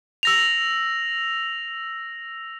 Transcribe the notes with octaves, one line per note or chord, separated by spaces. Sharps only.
E6 A#6 F7